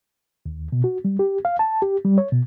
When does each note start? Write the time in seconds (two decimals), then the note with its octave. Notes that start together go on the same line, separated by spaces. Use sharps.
0.46 D#2
0.72 B2
0.84 F#4
1.05 G3
1.19 G4
1.45 F5
1.59 A5
1.82 G4
2.04 G3
2.18 C#5
2.32 B2